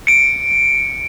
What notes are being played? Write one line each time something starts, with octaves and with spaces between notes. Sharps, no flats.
C#7 D7